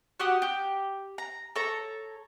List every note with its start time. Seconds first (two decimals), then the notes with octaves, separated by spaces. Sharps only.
0.20 F#4 G4 F#5 D#6
0.42 G4
1.18 A#5
1.56 A4 C#5 A#5